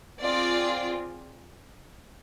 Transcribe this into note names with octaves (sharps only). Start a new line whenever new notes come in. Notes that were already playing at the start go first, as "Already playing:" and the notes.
C4 F4 G#4 D5